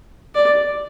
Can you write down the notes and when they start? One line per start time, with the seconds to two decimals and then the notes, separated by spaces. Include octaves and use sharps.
0.35 D5